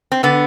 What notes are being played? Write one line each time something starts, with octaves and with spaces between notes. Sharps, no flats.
C4
D3 B3